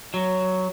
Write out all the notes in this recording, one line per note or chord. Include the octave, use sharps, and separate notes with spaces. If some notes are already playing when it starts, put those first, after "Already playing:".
F#3